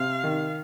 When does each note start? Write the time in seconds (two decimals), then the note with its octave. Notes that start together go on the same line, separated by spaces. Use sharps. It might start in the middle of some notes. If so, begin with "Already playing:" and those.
Already playing: C3 F5
0.24 D#3